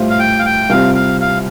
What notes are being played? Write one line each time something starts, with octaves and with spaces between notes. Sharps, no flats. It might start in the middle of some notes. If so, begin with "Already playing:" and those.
Already playing: A2 G3 F4 C5
F5
G5
F5
G5
C2 C3 G3 C4 F4 F5
F5
F5